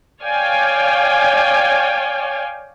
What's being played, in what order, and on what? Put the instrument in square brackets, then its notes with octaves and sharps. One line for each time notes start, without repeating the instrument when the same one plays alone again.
[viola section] C#5 D5 F5 G5 G#5